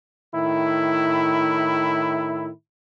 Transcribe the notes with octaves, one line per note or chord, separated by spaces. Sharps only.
A2 D#3 E4